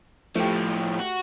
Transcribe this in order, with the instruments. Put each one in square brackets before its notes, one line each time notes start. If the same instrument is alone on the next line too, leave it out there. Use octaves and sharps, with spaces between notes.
[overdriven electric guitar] A2 F3 [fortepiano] A3 G4
[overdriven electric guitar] F#4